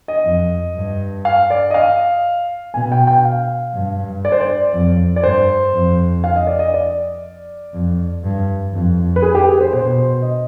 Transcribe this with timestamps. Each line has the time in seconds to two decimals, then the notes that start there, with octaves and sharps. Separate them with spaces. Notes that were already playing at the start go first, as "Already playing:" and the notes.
0.08 D#5
0.25 F2
0.75 G2
1.25 F5
1.50 D5
1.70 D#5
1.74 F5
2.74 B2 G#5
2.92 G5
3.07 G5
3.25 F5
3.74 G2
4.25 D5
4.32 C5
4.41 D5
4.73 F2
5.16 D5
5.23 G2 C5
5.73 F2
6.24 F5
6.36 D#5
6.47 D5
6.59 D#5
6.74 D5
7.73 F2
8.24 G2
8.73 F2
9.16 B4
9.22 G#4
9.35 G4
9.48 G#4
9.61 C5
9.73 B2 C5
10.22 D#5